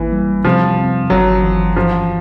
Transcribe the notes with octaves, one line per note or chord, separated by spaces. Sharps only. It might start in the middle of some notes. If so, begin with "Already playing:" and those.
Already playing: G#1 E3 A#3
G3
C3 F3
C4
G1 F#3
E3
G2 F3